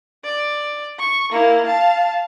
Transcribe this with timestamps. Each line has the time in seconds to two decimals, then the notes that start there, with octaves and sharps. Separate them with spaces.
0.24 D5
0.99 C#6
1.32 A#3 E4
1.66 F5 A5